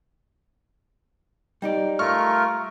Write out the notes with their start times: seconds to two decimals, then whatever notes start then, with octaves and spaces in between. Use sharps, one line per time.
1.62 G3 D#4 D5
1.99 A3 F4 A#4 C#6 F6